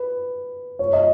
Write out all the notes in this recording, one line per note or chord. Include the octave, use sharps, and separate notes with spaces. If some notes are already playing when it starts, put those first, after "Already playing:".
Already playing: B4
C#5
D#5